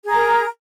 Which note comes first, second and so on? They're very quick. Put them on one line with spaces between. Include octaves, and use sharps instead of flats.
G#4 A#5 A#4